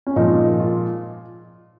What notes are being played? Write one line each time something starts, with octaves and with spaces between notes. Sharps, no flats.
C#4
A#2 F3 G#3 D#4
F4